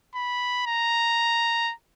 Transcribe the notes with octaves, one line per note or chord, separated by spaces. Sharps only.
B5
A#5